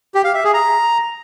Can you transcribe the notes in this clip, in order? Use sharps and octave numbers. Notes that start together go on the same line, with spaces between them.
G4
F5
E5
G#4
A#5